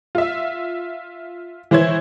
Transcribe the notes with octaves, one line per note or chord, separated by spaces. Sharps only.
F4 E5
E3 E4 C5 C#5 G#6